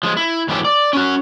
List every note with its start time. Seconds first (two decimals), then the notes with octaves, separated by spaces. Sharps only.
0.03 F3 G#3
0.17 E4
0.48 G#2 E3 F#3 G4 A4
0.65 D5
0.93 C#4 F#4